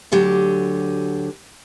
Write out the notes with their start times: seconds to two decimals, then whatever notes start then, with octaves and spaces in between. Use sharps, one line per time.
0.12 D2 D3 F#3 G4